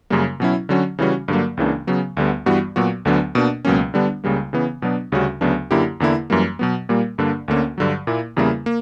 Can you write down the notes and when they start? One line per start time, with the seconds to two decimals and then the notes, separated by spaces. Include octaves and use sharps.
0.10 F#2 C#3 G3 A#3
0.40 B2 F#3 C#4 E4
0.69 D3 F#3 C#4 F#4
0.99 C#3 E3 G3 C#4 F#4
1.28 G2 D3 F#3 A#3
1.57 C#2 C#3 E3 A#3 D4
1.87 C#3 F#3 B3
2.17 D2 D3 G3 B3
2.46 G2 E3 G3 B3 F#4
2.76 A#2 F#3 B3 F#4
3.05 D2 D3 F#3 B3 D4
3.35 B2 A#3 D4
3.65 C#2 B2 F#3 A#3 C#4
3.94 D3 G3 B3 D4
4.24 C#2 C#3 G3 A#3
4.53 C#3 E3 B3
4.82 B2 F#3 B3 D4
5.12 D2 C#3 G3 C#4 F#4
5.41 D2 C#3 F#3 B3 D4
5.71 F#2 D3 A#3 E4 G4
6.00 E2 D3 A#3 E4
6.30 F#2 E3 G3 A#3
6.59 B2 F#3 B3
6.89 A#2 G3 A#3
7.18 G2 D3 A#3 D4
7.48 D2 D3 A#3 C#4
7.78 G2 D3 F#3
8.07 A#2 A#3 E4
8.37 E2 C#3 G3 A#3 E4
8.66 A#3